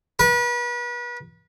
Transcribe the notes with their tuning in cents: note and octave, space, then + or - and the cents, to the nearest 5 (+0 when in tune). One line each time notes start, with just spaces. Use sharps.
B4 -35